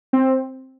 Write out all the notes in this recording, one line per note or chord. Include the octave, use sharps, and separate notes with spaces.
C4